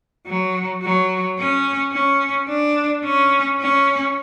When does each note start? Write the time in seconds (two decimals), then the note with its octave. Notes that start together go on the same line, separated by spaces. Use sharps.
0.27 F#3
0.83 F#3
1.38 C#4
1.93 C#4
2.48 D4
3.04 C#4
3.60 C#4